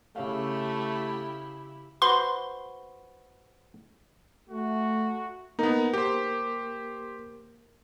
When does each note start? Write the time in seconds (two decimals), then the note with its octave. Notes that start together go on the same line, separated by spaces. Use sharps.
0.16 C#3 A3 E4 G4 C#5 F5
2.02 F#4 B4 C5 C6
4.50 A3 F#4
5.59 A#3 B3 D#4 A#4
5.94 G4 C5